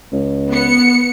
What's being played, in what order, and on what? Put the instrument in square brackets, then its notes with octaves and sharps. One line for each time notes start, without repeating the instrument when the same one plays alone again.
[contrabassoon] C#2
[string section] B3 C#7